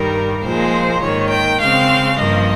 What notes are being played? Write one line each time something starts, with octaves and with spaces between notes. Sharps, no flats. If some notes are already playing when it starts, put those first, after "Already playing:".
Already playing: G2 D#3 G3 A#4
A#2 F3 G#3 C5
G#2 D#3 A#3 C#5
G5
C#3 G#3 C4 F5
G2 F3 A#3 D#5